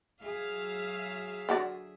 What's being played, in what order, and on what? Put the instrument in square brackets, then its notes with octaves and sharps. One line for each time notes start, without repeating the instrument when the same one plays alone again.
[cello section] F#3 G#4 E5 [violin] F5
[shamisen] D3 F#4 D5